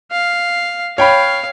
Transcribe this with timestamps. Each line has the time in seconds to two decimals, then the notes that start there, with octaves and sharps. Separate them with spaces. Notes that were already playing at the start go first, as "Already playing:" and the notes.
0.11 F5
0.98 C#5 F5 G5 B5